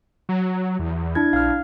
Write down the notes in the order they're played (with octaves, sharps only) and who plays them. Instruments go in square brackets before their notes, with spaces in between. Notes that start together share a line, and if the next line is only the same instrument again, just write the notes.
[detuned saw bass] F#3
E2
[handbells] D4 E4 G#6
[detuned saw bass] A#1 [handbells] F5 F6